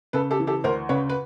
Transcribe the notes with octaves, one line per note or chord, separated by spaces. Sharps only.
C#3 A4 B4
G4 A4
E3
G4 A4
D2 A#4 C5
C#3 B4 C#5
B4